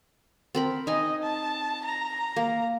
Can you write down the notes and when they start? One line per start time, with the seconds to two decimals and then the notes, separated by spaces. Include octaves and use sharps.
0.55 C4 A#4 B5
0.87 D#4 D#5 G#5
1.23 A5
1.85 A#5
2.36 A#3